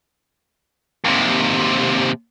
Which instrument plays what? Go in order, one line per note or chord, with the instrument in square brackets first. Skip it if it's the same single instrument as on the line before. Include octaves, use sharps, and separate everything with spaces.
[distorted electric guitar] D#2 C3